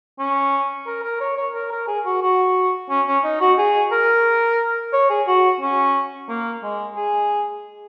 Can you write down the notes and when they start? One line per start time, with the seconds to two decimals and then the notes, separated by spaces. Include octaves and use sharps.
0.19 C#4
0.87 A#4
1.04 A#4
1.21 C#5
1.37 C#5
1.55 A#4
1.71 A#4
1.88 G#4
2.05 F#4
2.22 F#4
2.89 C#4
3.07 C#4
3.24 D#4
3.41 F#4
3.58 G#4
3.92 A#4
4.93 C#5
5.10 G#4
5.27 F#4
5.61 C#4
6.29 A#3
6.63 G#3
6.96 G#4